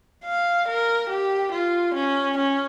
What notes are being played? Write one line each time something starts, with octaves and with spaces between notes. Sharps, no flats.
F5
A#4
G4
F4
C#4
C#4